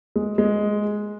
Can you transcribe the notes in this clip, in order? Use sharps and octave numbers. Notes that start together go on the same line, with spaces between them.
G#3
G#3